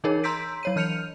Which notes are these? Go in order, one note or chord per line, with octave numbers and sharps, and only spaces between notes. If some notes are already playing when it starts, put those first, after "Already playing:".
E3 D#4 G#4 A#4 C#5
A#5 C6 E6 G6 B6 D7
F#3 C#5 D#7
E3 F6 G6 C#7 D#7 F7